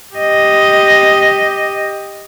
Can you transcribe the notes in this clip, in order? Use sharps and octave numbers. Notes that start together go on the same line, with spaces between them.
G4 D#5